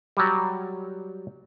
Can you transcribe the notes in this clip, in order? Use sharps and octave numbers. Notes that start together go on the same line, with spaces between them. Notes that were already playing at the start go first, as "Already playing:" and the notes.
F#3 G3